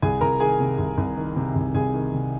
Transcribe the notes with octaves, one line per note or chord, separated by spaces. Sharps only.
C2 G#4 G#5
C2 A#4 A#5
D#3 G#4 G#5
C3
C2
C2
D#3
C3
C2
C2 G#4 G#5
D#3
C3